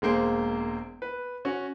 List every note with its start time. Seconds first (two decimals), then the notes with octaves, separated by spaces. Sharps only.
0.02 E1 G#3 A#3 C5
1.02 B4
1.45 C#4 F#4